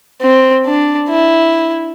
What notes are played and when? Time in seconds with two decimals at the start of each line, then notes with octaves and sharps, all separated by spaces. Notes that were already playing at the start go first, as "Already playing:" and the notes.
0.22 C4
0.66 D4
1.09 E4